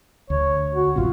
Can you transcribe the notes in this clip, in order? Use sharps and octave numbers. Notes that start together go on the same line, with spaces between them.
D2 C#5
F#4
A1 F#2 C3 F4